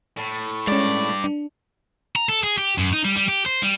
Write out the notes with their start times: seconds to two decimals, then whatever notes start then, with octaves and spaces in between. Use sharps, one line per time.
0.17 A2
0.67 G2 G#3 C#4 D5
1.24 D4
2.16 A#5
2.29 A4
2.43 G#4
2.58 G4
2.78 F#2
2.93 D#4
3.04 G3
3.17 G3
3.28 G4
3.46 C5
3.62 G3